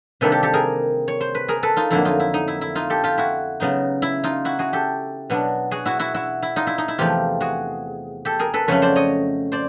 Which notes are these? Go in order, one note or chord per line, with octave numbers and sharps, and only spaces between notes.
C3 D#3 G3 A#3 D4 A4 B4
G4 A4
G4 A4
G#4 A#4
C#5
C5
B4
G#4 A#4
A4 B4
D#4 F4
F2 D3 F#3 A#3 E4
D#4 F4
E4
D#4
E4
E4
D#4 F4
G4 A4
F4 G4
E4 F#4
C#3 F#3 B3 D#4
E4
D#4 F4
E4 F#4
F#4 G#4
G4 A4
B2 F#3 B3 D4
F#4 G#4
E4 F#4
E4 F#4
E4 F#4
E4
D#4 F4
E4
D#4
E4
E2 C3 F3 A3 F4 G4
F#4 G#4
G4 A4
G#4 A#4
A4 B4
F2 C#3 F#3 A3 C#4 B4 C#5
C5 D5
C#5 D#5
C5 D5